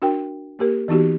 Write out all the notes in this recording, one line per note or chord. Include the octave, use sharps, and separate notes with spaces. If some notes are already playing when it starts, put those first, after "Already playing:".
D4 F#4 A#4 G5
A#3 G4 A#4
E3 B3 D#4 F#4 G4